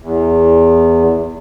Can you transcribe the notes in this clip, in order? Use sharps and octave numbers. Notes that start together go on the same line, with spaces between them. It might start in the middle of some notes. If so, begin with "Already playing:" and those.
E2